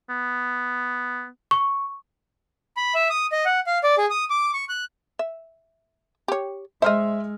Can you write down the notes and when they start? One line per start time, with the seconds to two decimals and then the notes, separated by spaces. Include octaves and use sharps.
0.10 B3
1.51 C#6
2.77 B5
2.95 E5
3.10 D#6
3.32 D#5
3.45 F#5
3.67 F5
3.84 D5
3.98 G#4
4.11 D#6
4.30 D6
4.54 C#6
4.69 F#6
5.19 E5
6.28 G4 C#5
6.82 G#3 C5 D#5 E5 C6 F6